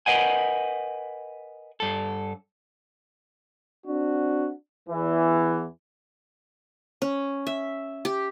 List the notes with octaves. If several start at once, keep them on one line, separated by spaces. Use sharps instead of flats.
A#4 B4 D#5 F#5 G#5
G2 A4
C4 D4 F#4
E2 E3
C#4
E5
G4